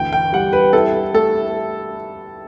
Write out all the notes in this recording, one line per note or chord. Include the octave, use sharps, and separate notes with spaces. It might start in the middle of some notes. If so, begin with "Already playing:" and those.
Already playing: D2 E3 G5
G5
G3 F#5
B4
E4 A4
A3 A4